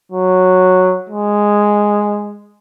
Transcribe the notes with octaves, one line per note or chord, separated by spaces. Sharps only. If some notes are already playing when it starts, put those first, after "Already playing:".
F#3
G#3